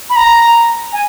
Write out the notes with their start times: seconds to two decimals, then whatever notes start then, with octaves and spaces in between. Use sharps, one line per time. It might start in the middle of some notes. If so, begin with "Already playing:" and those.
0.10 B5
0.16 A#5
0.93 G#5